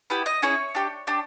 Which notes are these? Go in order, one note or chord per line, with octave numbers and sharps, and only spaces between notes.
B3 E4 G4
D#5
C#4 E4 G#4 C#5
D4 G4
D4 G4